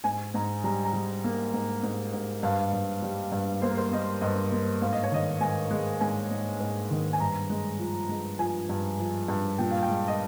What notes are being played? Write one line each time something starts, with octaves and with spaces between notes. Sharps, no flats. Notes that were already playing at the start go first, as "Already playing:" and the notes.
G#2 G#5
G#2 A#5
G3 A#5
A#5
G3
A#3
G#2
G#2
G#2
G2 F5
G2
G3
G2
A#3 C5
A#4
C5
A#3 D#5
G2 D#5
A#3
G#2 F5
D#5
C#5
D#3 D#5
G#2 G#5
G#3
G#2 G#5
G#2
G#2
D#3
G#5
G2 A#5
G#3
F3
G#3
F3 G#5
G2
F3
G2
A#2 G5
F5
G5
G#3
D#5